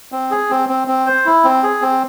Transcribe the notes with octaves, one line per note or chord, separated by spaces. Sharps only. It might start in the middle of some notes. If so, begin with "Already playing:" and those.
C4
G#4
C4
C4
C4
C5
E4
C4
G#4
C4